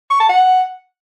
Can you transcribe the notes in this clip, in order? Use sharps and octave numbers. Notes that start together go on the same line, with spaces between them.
C#6
A5
F#5